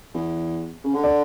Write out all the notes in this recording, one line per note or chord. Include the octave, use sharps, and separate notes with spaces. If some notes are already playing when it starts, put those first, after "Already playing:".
E2
C#3
D3
D5